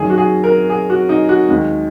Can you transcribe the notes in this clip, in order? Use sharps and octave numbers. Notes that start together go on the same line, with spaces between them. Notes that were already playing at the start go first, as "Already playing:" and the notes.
Already playing: F#2 D#3 F#3 G#4
F#4
G#4
A#4
G#4
F#4
D#4
F#4
D#2 D#3 G#3